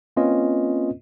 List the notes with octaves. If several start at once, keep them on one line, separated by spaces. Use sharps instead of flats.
A#3 C4 C#4 F4 B4 D#5